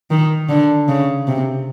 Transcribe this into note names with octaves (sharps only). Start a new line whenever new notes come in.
D#3
D3
C#3
C3